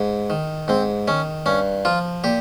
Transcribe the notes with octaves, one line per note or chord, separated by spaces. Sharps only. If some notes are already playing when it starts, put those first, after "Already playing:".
Already playing: G#2
D#3
G#2 C4
D#3 C#4
G2 C#4
F3 F4
A#2 G4